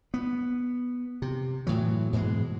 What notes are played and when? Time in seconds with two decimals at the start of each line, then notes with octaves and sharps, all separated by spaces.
0.14 B3
1.22 C3
1.67 A2 E3 F#3
2.13 G#2 B2 E3 G#3